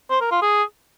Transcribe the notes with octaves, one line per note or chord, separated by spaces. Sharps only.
C5
A#4
F4
G#4